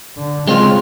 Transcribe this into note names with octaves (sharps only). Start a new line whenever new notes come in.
D3
C#3 G#3 C4 F4